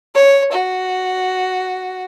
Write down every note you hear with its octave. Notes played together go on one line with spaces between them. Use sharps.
C#5
F#4